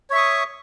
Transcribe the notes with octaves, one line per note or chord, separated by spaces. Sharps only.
C#5 E5 C#6 D#6